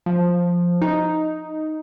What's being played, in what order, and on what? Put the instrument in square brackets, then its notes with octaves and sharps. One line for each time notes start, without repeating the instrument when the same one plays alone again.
[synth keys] F3
D#4